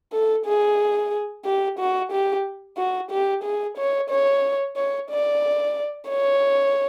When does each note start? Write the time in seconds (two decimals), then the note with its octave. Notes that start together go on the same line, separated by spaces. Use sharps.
0.13 A4
0.45 G#4
1.45 G4
1.79 F#4
2.12 G4
2.78 F#4
3.11 G4
3.44 G#4
3.78 C#5
4.10 C#5
4.77 C#5
5.10 D5
6.09 C#5